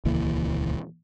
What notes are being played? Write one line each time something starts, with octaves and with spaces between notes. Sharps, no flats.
D#1 C#2 E3 A#3